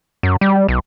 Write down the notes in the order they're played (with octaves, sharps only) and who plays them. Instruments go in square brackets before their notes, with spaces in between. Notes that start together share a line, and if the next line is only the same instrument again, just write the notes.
[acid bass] F#2
G3
B1